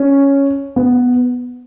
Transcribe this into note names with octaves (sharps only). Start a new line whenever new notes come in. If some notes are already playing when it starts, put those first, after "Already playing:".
Already playing: C#4
B3